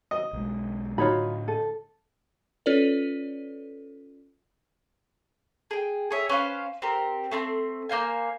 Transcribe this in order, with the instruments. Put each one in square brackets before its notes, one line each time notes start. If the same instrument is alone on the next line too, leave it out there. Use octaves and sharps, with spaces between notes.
[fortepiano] D#5
[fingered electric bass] B1 G#3
[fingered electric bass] A2 D3 [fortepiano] F#3 D#4 [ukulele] F4 C#5 B5
[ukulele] A4
[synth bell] C#4 F4 A4 B4 C#5 D5
[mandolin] G#4 G5
G#4 C#5 E5
C#4 B4 C5 F5
C4 G4 A#4
A3 C4 A5 C6
A#3 C5 F5 G#5